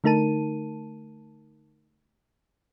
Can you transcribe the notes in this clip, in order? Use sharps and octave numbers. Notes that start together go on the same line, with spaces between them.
D3 A3 D#4 A#4 A5 D#7